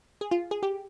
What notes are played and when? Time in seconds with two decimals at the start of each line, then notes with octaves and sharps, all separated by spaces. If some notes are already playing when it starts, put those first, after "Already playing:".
0.21 G#4
0.31 F4
0.51 G#4
0.63 G4